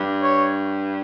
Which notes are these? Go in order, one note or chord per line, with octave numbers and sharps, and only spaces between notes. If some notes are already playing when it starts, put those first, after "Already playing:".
Already playing: G2
C#5